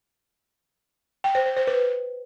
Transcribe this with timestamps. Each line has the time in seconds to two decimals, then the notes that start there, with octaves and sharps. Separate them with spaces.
1.24 G5
1.35 C5
1.46 C5
1.57 C5
1.67 B4